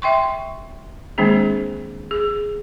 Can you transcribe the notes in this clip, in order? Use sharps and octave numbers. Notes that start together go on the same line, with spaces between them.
E5 G5 C6 C#6
D#3 G#3 A#3 C4 D4 G#4
G#4